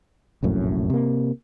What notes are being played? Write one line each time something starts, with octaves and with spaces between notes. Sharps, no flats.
F1 A#1 F#2 A2
C3 A#3